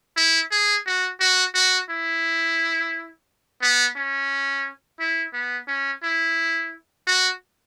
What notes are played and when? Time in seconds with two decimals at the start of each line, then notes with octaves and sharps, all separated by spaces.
0.16 E4
0.51 G#4
0.86 F#4
1.20 F#4
1.55 F#4
1.90 E4
3.62 B3
3.96 C#4
5.00 E4
5.33 B3
5.68 C#4
6.03 E4
7.07 F#4